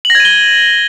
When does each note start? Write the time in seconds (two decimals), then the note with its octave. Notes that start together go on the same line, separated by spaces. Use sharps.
0.05 F#7
0.10 A#6
0.15 G#6
0.20 D#7
0.25 G7